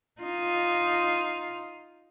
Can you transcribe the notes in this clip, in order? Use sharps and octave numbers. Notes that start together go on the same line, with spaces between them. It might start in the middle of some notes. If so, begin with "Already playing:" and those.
D#4 F4